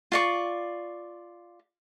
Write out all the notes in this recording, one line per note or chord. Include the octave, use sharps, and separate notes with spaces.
F4 D5 C#6